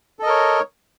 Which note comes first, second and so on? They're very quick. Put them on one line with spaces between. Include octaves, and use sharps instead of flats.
A4 D#5 A#4 C#5